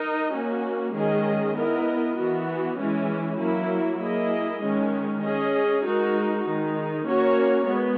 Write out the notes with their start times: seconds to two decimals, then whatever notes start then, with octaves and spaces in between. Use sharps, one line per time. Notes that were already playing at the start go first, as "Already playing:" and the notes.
Already playing: D#4 A#4 D#5
0.33 A#3 C#4 F#4
0.94 D#3 G#3 C#4 G#4 D#5
1.55 B3 E4 A#4 D#5
2.17 E3 B3 F#4
2.78 E3 G#3 C#4 E4
3.39 F#3 A#3 E4
4.00 A#3 E4 G#4 D#5
4.62 D#3 G#3 C#4
5.22 C#4 G#4 D#5
5.84 G#3 D#4 F#4 A#4
6.45 D#3 G#3 D#4
7.06 A#3 C#4 F#4 A#4 C#5
7.67 G#3 B3